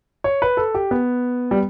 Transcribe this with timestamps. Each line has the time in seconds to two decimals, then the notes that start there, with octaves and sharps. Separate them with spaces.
0.24 C#5
0.42 B4
0.57 A4
0.75 G4
0.91 B3
1.51 G3